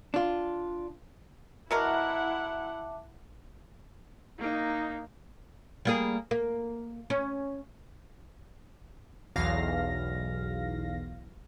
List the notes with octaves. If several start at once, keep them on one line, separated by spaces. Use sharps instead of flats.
D4 F4
B2 F#3 E4 A#4 E5 F#5 A5 D6
A#3 D#4
G3 A#3 G#4
A#3
C#4
B1 E2 F5 A#6